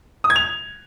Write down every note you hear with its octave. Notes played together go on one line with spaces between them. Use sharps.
D#6
G#6
F7